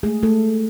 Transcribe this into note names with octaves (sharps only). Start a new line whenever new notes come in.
G#3 A3 G#4
A3 A4